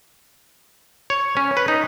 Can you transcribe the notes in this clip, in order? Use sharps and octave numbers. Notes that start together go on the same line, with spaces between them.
C#5
C#4
B4
D#4